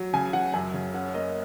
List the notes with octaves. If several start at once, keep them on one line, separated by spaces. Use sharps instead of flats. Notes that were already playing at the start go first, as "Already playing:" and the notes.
Already playing: F#3
C#3 G#5
F#3 F#5
F#2 G#5
C#3
C#4 F#5
A#3 D#5